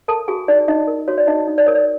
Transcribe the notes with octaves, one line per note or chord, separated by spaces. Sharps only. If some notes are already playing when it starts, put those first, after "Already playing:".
A4 A#4 A5
F#4 G#4 G#5
D#4 D5
D#4 D#5
A#4
F#4 C#5
D5
D#4 D#5
D#4
D5
A#4 C#5
D5